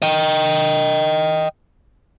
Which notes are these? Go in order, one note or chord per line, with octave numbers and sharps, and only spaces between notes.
D#5 G5